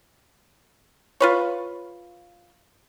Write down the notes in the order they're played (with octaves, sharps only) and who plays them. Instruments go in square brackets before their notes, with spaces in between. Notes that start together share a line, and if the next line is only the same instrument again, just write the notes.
[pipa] F4 B4 C#5